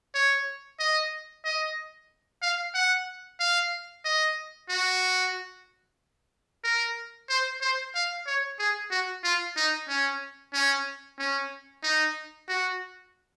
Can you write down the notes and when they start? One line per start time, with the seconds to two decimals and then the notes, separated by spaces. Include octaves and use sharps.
0.15 C#5
0.80 D#5
1.45 D#5
2.42 F5
2.75 F#5
3.40 F5
4.05 D#5
4.69 F#4
6.64 A#4
7.30 C5
7.61 C5
7.95 F5
8.27 C#5
8.59 G#4
8.91 F#4
9.24 F4
9.56 D#4
9.88 C#4
10.54 C#4
11.19 C#4
11.84 D#4
12.49 F#4